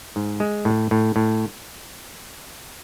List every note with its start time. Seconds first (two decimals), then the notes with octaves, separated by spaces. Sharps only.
0.16 G#2
0.40 G#3
0.65 A2
0.91 A2
1.16 A2